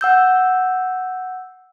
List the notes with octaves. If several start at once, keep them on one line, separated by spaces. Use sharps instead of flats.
F#5 E6 G6